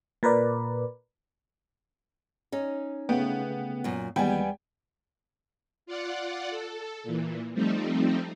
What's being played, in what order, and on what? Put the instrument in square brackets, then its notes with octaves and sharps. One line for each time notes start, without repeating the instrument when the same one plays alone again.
[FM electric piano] A#2 A#4 B4 D5
[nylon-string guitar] C#4 D#4
[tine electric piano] C#3 A3 G5 [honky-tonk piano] B3
[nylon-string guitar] F#2 A#2
[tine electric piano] D#2 E3 G#3 [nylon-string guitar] G3 B3 [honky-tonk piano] G5 G#5
[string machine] F4 D5 F#5
A4
A#2 E3
F3 G3 A3 C4 D#4